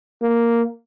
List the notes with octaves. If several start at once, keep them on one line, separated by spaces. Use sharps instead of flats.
A#3